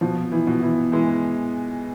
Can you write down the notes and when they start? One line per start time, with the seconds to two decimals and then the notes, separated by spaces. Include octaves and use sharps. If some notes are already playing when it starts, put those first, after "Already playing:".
0.01 B2 F3
0.32 E3
0.47 B2
0.62 E3
0.92 E3 G#3